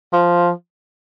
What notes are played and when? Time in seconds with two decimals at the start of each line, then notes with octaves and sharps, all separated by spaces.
0.13 F3